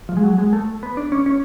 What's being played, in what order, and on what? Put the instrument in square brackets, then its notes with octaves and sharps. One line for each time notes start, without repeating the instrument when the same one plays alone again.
[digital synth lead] F3
G#3
F#3
G#3
A3
B3
D4
C#4
C#4